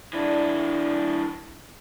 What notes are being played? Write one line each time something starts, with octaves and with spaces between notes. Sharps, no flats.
E3 D4